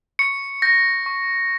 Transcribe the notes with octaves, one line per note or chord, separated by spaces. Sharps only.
C#6 C#7
G6 A#6
C#6